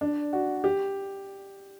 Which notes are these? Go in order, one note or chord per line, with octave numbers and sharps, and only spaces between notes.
D4
F#4
G4